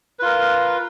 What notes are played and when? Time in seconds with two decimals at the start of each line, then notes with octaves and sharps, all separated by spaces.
0.19 B4
0.22 F4
0.25 A#4